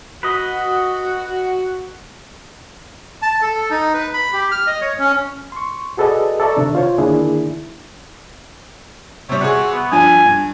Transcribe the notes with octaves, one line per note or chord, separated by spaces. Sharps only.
F#4 B4 D#5
A5
A4
D#4
B4
B5
G4
F6
D#5
C#5
C#4
C6 C#6
F#4 G#4 A4 B4 D5 D#5
A4 D5 E5 A#5 C#6
C3 D#3 D4
F4 C5 C#5
D3 D#3 A#3 D4 E4 G#4
C3 G3 C#5
C3 F#4 G#4
B3
G2 F3 D4 G#5
G2